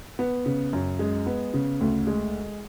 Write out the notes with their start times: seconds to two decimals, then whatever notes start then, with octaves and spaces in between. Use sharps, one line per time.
0.19 B3
0.46 C#3
0.73 F#2
0.99 G#3
1.26 B3
1.54 C#3
1.81 D2
2.07 G#3